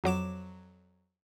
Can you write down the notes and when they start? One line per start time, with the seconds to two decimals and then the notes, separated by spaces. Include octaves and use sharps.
0.04 F2 F#3 D6 E7